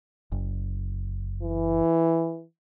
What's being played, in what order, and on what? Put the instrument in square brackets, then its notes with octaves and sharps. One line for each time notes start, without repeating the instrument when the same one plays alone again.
[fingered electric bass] F#1
[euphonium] E3